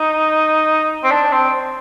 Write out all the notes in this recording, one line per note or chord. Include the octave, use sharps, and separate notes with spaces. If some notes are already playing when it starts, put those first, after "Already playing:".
Already playing: D#4
C4
D4
C4